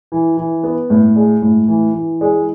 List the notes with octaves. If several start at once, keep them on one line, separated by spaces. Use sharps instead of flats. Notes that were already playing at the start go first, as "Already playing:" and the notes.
E3
E3
B3
A2
G#3
A2
E3
E3
G#3